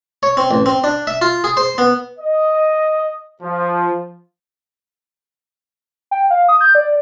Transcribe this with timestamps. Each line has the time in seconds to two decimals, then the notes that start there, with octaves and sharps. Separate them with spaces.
0.23 C#5
0.37 C4
0.51 A1
0.66 C4
0.84 D4
1.07 E5
1.21 F4
1.44 G#4
1.57 C5
1.78 B3
2.19 D#5
3.42 F3
6.11 G5
6.30 F5
6.49 D#6
6.61 G6
6.75 D5